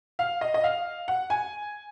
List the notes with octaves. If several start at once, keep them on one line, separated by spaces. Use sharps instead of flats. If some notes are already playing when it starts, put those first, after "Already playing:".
F5
D#5
D#5
F5
F#5
G#5